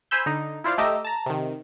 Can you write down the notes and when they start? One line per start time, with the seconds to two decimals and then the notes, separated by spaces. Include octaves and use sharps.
0.11 C5 G#5 B5 E6 G6
0.26 D3 D#4
0.64 E4 F4 C5 D5 F5
0.78 A3 G4 D#5 A#5 D6 E6
1.05 A5 A#5
1.26 C3 D#3